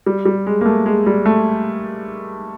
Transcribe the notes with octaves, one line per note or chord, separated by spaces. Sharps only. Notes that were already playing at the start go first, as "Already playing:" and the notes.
G3
G3
G#3
A#3
A3
G#3
G3
A3